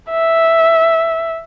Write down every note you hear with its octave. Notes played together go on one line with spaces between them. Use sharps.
E5